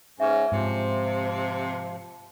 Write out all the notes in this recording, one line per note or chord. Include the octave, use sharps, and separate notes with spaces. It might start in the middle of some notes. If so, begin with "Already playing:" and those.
G#2 C#4 B4 E5
G#2 C3 F3